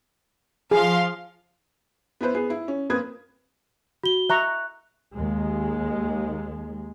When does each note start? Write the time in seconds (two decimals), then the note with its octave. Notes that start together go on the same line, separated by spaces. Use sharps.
0.71 F3 G#4 F5 C6
2.21 B3 E4 B4 C5
2.35 B3 G#4
2.50 E4
2.68 C#4
2.90 A#3 C4 B4 D#6 G#6
4.04 F#4 G7
4.30 E5 A#5 C#6 F#6
5.14 D#2 G#3